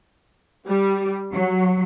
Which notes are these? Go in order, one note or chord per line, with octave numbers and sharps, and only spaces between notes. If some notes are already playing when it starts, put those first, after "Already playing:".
G3
F#3